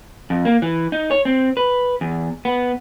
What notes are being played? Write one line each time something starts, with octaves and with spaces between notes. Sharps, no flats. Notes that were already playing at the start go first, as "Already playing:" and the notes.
F2
A#3
E3
D#4
C#5
C4
B4
E2
B3